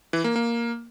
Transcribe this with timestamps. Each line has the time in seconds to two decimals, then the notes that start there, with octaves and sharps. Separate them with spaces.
0.13 E3
0.24 A#3
0.36 A#3